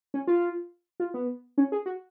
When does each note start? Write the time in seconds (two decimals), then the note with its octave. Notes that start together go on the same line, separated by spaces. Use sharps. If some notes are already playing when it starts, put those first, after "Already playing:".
0.14 C#4
0.27 F4
1.00 F4
1.14 B3
1.58 C#4
1.72 G#4
1.86 F#4